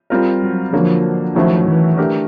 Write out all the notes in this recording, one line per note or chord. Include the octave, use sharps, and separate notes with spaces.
G3 C4 F4 A#4
F#3
D3 F3 F#3 A#3
D#3 F3 F#3 A3 C#4 E4
E3
A3 D4 G4 A#4